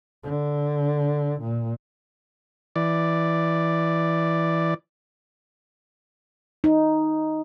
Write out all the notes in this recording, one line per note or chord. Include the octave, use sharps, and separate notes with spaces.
D3
A#2
E3 D5
D#4